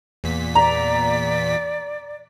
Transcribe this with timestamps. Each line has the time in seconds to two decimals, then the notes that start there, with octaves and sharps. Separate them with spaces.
0.24 E2 A#2 B6
0.55 D5 A#5